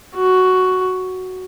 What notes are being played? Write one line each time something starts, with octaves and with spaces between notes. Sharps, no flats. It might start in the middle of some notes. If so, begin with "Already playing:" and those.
F#4